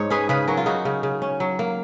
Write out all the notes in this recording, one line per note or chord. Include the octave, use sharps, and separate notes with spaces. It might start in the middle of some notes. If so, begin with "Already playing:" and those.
Already playing: G#2 D#4 C#5
C#4 G#4 B4
C#3 G#4 B4
F#3 F#4 A#4
F4
C#3 D#4 F#4
C#3
C#3
C#4
F#3
A#3